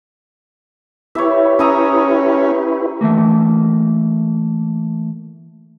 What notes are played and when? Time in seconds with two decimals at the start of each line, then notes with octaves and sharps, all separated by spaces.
1.15 E4 G4 B4 C#5 D5 E5
1.59 C#4 A#5 D#6 E6
3.01 E3 A3 A#3